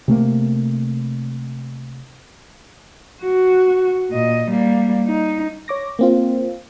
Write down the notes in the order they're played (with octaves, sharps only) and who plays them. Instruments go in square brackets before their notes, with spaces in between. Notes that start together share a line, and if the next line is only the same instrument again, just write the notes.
[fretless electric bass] C3 A3 A#3
[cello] F#4
A#2 D#5
G3 A#3
D#4
[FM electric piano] C#5 D6 A#6
A#3 C4 F4